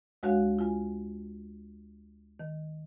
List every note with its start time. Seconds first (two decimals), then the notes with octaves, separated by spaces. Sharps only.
0.23 D2 G#3 F#4 C#5 F5 F#6
0.59 F4 G#5
2.40 D#3